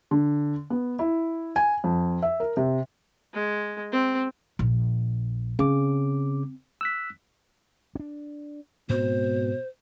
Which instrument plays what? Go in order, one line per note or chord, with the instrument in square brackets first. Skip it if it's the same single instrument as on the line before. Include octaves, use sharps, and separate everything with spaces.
[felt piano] D3
B3
E4
G#5
F2
E5
A#4
C3
[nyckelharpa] G#3
C4
[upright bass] A#1
[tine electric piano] C#3 D6 [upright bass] C4
[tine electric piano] E6 F#6 B6
[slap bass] C#4 D4
[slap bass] G#2 C4 [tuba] B2 [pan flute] C5